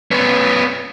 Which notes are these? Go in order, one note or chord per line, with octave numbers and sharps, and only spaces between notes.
B3 C#4